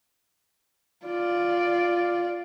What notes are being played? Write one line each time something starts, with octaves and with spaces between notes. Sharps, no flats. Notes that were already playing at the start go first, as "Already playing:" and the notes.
F4 D5